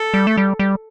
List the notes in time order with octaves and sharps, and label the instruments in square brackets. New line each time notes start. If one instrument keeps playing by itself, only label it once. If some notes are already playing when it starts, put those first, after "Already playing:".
Already playing: [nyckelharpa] A4
[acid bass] G3
A3
G3
G3